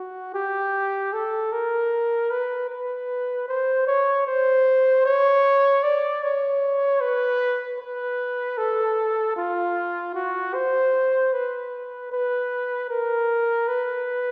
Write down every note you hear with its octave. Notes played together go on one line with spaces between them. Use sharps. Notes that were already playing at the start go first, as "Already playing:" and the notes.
Already playing: F#4
G4
A4
A#4
B4
B4
C5
C#5
C5
C#5
D5
C#5
B4
B4
A4
F4
F#4
C5
B4
B4
A#4
B4